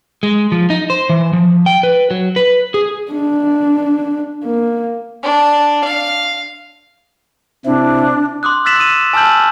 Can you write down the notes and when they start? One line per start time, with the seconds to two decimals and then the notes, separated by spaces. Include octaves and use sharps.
0.23 G#3
0.52 F3
0.70 D#4
0.90 C5
1.09 E3
1.33 F3
1.66 G5
1.83 B4
2.11 F#3
2.36 B4
2.74 G#4
3.12 D4
4.44 A#3
5.23 D4
5.84 F5
7.66 C3 C4 D4 E4
8.43 C6 D6 D#6 F#6
8.65 E6 F#6 A6 B6 E7 F#7
8.79 D#6 D#7
9.13 G#5 A5 E6 F6 G6 F#7